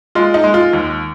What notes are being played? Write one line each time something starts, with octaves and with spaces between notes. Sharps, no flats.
G#3 F4
D#4
G#3
F4
D#2